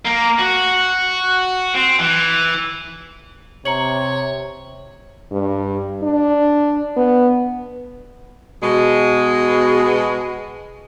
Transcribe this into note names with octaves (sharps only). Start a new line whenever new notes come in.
A#3
F#4
C4
E3
C3 C#5 A#5 C#7 F#7
G2
D4
B3
B2 G#3